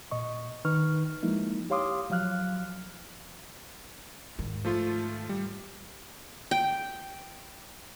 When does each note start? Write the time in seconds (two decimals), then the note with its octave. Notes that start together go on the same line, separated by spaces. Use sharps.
0.11 A#2 D#5 C#6
0.65 D#3 D#4 B4 C#6 F6
1.23 F3 G#3 A#3 D#4 E4
1.70 G4 C#5 F5 C6 D6 D#6
2.10 F3 F#3 F5 F6 F#6
4.39 G#2 D#3
4.65 F3 A3 F4
5.29 G3
6.51 G5